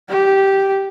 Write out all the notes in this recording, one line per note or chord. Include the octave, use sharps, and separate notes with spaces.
G4